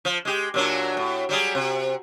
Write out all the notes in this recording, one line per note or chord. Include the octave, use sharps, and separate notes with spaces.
F3
G#3 G4
A#2 F#3 D4
A2
F#3 G3 G#4
C3